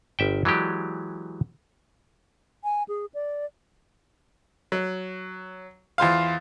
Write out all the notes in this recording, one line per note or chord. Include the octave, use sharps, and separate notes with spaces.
G1 E5 G5
E3 F#3 G#3 G4 D5
G#5
G#4
D5
F#3
E2 F4 C5 F5